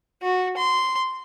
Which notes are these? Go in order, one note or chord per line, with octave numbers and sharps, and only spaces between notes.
F#4
C6